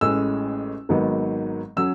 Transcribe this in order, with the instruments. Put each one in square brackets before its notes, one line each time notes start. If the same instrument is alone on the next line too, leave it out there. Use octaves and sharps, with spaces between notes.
[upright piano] A1 A2 G#3 C#4 E6
G#1 G#2 D#3 F#3 B3
F#3 C#4 E6